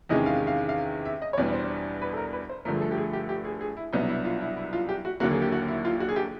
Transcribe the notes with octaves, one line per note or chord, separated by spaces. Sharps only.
E2 C3 D#3 G#3 C#4 D#5
F5
F5
F5
E5
D#5
C#5
E2 B2 G3 B3 D4 D5
C5
B4
A4
A#4
B4
C5
G2 D3 F3 A3 A#4
G#4
A4
G4
G#4
G4
G4
G#4
G#4
E4
C2 B2 F#3 B3 D4 D#4
E4
F4
E4
E4
F4
G4
F#4
D#2 D3 F#3 A#3 F#4
G#4
G4
F#4
E4
F4
F#4
G#4
G4